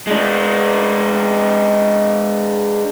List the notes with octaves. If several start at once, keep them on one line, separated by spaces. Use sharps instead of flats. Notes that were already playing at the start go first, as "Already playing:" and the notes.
G#3 D4